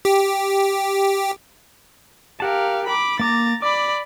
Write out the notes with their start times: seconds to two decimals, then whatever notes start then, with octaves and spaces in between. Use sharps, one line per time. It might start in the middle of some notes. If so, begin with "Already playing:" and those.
0.05 G4
2.40 G4 A#4 F5 F#5 A5
2.87 B5 D6
3.19 A#3 A#5 D6 A6
3.62 D5 B5 D6